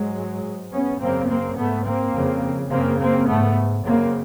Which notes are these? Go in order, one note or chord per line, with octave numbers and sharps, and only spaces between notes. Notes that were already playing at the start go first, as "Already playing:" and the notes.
Already playing: G#2 F#3 G#3
G#2
B3 C#4
F#2 C#3 A#3 C4
A#3 C4
G#2 A3 B3
A#3 C4
F2 C#3
F#2 C#3 A#3 C4
A#3 C4
G#2 A3 B3
F#2 C#3 A#3 C4